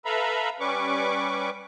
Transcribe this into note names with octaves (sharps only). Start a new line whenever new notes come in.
A4 B4 E5 F5 A#5 B5
G3 C#4 B4 C#6 D6